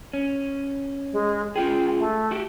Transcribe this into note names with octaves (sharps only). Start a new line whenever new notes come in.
C#4
G#3
C#4 F4 G#4 G5
A3
F#4 G4